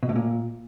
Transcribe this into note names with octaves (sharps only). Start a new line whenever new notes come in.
B2
A2
A#2